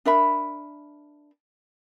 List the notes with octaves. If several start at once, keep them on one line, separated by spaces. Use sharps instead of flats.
D4 A#4 E5 B5